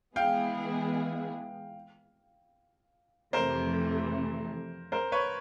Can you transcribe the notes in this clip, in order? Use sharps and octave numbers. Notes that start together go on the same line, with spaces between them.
E3 G#3 B3 E4 G#4 F5 G5
F2 C3 E3 A3 A#4 C5
A#4 C5
B4 C#5